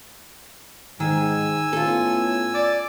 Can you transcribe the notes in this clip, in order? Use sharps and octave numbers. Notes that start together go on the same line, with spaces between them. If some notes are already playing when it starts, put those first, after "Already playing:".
G#2 D#3 G#5 E6
A2 B3 C#4 F4 A4
D5